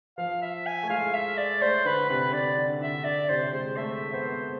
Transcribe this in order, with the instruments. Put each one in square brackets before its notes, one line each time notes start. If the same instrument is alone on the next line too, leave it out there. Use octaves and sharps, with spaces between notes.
[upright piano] F3 [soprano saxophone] F5
[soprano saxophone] E5
G#5
[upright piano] A3
[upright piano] G#3 [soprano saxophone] F5
[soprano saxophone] E5
D5
[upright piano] A3 [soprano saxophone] C5
[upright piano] D3 [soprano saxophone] B4
[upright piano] C3 [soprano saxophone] B4
[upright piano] D3 [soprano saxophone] D5
[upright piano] D3
[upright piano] D3 [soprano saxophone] E5
[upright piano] D3 [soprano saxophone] D5
[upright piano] C3 [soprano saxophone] C5
[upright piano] G#3 [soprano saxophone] C5
[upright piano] A3 [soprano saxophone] E5
[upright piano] B3 [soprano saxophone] C5